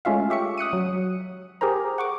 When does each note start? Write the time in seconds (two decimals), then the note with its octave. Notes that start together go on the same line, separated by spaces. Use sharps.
0.05 G#3 A3 C#4 F4 E5 F5
0.30 G4 E5 C#6 C#7
0.58 D#6 F#6 C#7 D#7
0.73 F#3
1.61 G4 G#4 A#4 C5 A#5
1.98 F#5 C#6 D6